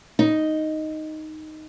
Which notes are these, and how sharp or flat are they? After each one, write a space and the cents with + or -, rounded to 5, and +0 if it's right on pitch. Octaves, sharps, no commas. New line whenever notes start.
D#4 +0